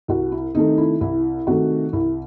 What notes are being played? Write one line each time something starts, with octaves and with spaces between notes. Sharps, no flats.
C2 F#4
E4
C3 D#3 A3 D#4
E4
C2 E4
C3 D#3 A3 F#4
C2 E4